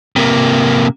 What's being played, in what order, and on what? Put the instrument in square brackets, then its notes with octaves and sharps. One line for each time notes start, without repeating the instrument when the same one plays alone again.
[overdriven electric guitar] C3 A#3